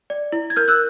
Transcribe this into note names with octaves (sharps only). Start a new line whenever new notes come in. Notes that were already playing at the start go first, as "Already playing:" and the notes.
D5
E4
G#6
A#4 F6 G6
E6 F#6